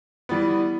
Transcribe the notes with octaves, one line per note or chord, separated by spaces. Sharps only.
E3 G3 B3